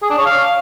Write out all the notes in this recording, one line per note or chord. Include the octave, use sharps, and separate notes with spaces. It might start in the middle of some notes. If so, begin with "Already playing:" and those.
G#4
D4
C#5
F5